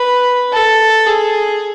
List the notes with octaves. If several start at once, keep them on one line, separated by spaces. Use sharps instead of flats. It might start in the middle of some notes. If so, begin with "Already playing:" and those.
Already playing: B4
A4
G#4